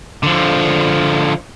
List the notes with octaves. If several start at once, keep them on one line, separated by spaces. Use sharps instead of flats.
D3 F3